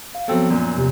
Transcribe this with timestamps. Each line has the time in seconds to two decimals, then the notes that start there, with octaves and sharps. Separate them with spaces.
0.15 F5
0.28 F3 F#3 B3 C4 A4
0.50 F#2 A#2
0.76 E2 C3 G4